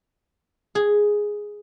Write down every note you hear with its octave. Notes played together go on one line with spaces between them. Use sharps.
G#4